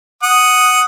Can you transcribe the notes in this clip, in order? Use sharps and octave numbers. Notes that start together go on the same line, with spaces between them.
F#5 D#6